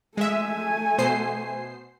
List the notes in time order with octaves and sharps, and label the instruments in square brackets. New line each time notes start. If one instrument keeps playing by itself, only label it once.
[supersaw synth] G#3 E5 [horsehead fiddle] A3 G#5
[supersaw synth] B2 C5 C7